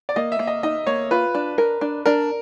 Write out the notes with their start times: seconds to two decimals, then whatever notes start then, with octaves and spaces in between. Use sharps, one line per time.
0.09 D5
0.16 A#3 D#5
0.32 E5
0.39 A#3
0.47 D#5
0.63 D#4 D#5
0.87 A#3 C#5
1.11 F4 B4
1.35 D4
1.58 A#4
1.81 D4
2.06 D4 A#4